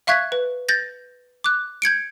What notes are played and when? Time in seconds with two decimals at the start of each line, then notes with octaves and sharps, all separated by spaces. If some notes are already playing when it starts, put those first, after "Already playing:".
0.07 E5 F5 C#6 F#6 G#6 B6
0.32 B4
0.69 G6 A6 A#6
1.44 D6 F#6
1.82 G6 G#6 C#7 D7